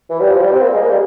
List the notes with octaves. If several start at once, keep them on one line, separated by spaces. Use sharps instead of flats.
E3
G3
F3
G3
C4
A#3
G#3
A#3
G3